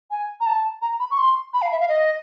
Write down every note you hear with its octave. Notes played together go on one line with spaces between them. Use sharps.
G#5
A#5
A5
A#5
B5
C#6
C6
B5
F5
E5
F5
D#5